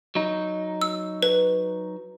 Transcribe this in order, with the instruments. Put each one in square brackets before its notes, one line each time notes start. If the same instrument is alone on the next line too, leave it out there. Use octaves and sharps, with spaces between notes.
[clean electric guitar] F#3 D#4
[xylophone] E6
B4